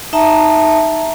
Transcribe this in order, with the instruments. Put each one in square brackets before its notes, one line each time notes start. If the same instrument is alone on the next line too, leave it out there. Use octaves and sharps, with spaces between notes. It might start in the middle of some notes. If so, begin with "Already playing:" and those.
[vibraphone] D#4 E5 A5 A#5